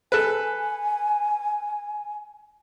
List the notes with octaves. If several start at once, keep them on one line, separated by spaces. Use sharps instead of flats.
A4 B4 G#5